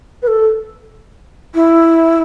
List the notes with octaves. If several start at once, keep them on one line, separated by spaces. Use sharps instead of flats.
B4
A4
E4